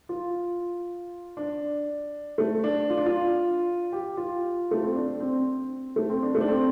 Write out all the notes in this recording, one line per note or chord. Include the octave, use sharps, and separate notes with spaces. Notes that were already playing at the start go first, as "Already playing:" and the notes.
F4
D4
A3
D4
F4
D4
F4
G4
F4
A3
C4
D4
C4
A3
C4
D4
A3
D4
C4